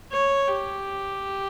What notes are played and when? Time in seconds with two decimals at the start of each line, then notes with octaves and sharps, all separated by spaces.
0.12 C#5
0.48 G4